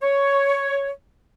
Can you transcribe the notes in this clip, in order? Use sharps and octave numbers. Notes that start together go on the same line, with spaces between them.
C#5